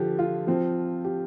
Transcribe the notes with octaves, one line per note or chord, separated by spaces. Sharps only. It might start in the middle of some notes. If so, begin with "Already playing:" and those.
Already playing: D3 F3 G4
F4
F3 C4
G4